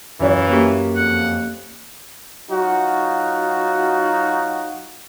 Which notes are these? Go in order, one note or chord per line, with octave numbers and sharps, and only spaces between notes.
F#2 E3 F4 C#5
A#3 C#4 G4
F2 F#5
F#3 D#4 F4 F#4